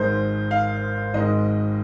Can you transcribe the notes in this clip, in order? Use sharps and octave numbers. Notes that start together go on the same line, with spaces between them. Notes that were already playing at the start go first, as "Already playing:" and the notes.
Already playing: G#1 G#2 G#3 C5
F5
G#1 G#2 G#3 D#5